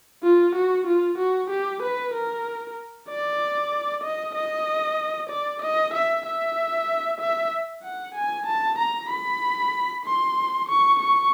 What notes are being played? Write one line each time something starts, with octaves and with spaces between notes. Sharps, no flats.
F4
F#4
F4
F#4
G4
B4
A#4
D5
D#5
D#5
D5
D#5
E5
E5
E5
F#5
G#5
A5
A#5
B5
C6
C#6
C#6